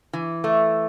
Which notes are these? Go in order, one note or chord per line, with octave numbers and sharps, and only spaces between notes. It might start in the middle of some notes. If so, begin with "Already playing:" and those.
E3
A3